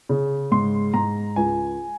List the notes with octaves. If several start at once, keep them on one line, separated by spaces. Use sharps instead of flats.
C#3
G#2 C6
G#2 A#5
C#2 G#5